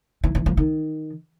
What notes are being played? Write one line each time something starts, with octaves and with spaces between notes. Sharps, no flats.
E3
E3
F3
D#3